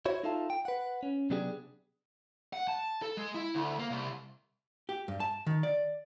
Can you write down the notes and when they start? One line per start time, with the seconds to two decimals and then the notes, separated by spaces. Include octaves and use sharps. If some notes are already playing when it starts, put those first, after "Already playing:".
0.05 E4 F#4 C5 C#5
0.24 D#4 F4 A4 E5 F5 A5
0.50 G5
0.65 B4 F#5
1.03 C#4
1.30 C3 F#3 B3 D4 G4 G#4
2.53 F#5
2.68 A5
3.02 A4
3.17 G#3
3.34 E4
3.55 D2
3.79 A#3
3.91 C2
4.89 G4
5.08 G2
5.20 A5
5.47 D#3
5.63 D5